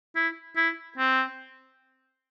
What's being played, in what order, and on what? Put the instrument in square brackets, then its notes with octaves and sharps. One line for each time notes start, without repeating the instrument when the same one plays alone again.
[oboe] E4
E4
C4